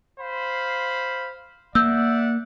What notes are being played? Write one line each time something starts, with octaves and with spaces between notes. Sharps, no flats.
C5 F5 B5
A#3 D5 E5 F#5 E6 G6